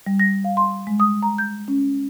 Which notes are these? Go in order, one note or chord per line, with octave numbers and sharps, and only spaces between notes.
G3
A#6
F5
C6
G#3
D#6
A#5
G6
C#4